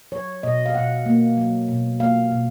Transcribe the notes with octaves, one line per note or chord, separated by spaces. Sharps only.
F#3 C#5
B2 D#5
F5
B2 F#5
A#3
F#3
B2
A#3 F5
B2